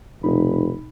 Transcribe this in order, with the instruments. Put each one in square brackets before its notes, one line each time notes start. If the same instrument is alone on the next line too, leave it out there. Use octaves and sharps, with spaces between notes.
[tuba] F1 [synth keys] B2 D#4 B5